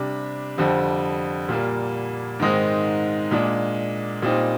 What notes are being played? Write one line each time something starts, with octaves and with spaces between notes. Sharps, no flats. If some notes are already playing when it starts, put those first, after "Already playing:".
Already playing: C3 G3 D4
F2 D3 G3 C4
A#2 G3 A#3
G#2 D#3 G#3 C4 D#4
A#2 G#3 D4
A#2 G3 C4 D#4